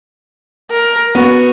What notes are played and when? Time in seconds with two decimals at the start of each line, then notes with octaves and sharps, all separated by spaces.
0.71 A#4
1.15 B3 F#4